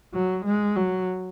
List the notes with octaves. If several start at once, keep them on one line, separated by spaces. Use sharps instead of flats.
F#3
G#3
F#3